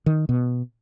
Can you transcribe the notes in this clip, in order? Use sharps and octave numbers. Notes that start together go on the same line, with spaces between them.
D#3
B2